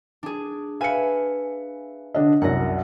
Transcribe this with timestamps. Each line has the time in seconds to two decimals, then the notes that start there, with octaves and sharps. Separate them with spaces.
0.23 D4 G#4
0.81 B4 E5 F5 G#5 C#7
2.14 D3 D4 D#5
2.42 C2 F#2 F#5 A#6